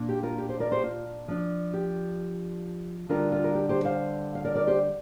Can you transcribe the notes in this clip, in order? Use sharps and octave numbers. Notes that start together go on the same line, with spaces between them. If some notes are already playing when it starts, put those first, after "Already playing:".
Already playing: A#2 A#3 D4
G4
F4 A#4
G4
G4 C5
A#4 D5
G4 C5
F4
F3 D4
G4
D3 G3 D4 F4 A#4
F4
A#4
G4
G4 C5
C5 F5
F5
A#4 D5
A#4 D5
G4 C5